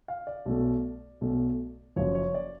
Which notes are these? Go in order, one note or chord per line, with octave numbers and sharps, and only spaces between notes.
F5
D5
B1 B2 A3
B1 B2 A3
F#1 F#2 F3 C#5
C#5
D5